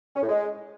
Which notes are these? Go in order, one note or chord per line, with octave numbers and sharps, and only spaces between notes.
C#4
A2
G#3